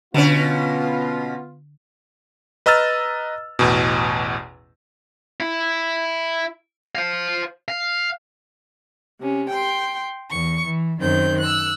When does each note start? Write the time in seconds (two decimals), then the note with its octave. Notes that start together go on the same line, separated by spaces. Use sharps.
0.14 B2 D3 B3 C#4 D4 F4
2.66 B4 D#5 A#5 E6 F6 A6
3.59 A1 E2 B2
5.40 E4
6.95 C5 F5
7.68 F5
9.19 C3 C#4
9.49 G5 C6
10.30 E2 C#6
10.64 E3
10.99 F#2 D#3 C4 G6
11.40 E6 F#6